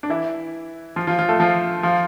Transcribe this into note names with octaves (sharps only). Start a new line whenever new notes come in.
D4
E3 E4
F3 F4
F3 F4
F3 F4
A3 A4
F3 F4
F3 F4